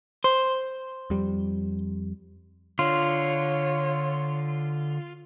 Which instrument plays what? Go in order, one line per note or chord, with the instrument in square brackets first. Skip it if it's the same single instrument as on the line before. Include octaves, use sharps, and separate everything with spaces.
[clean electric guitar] C5
[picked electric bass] F2 G3
[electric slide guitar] D3 [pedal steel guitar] F4 [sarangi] C#5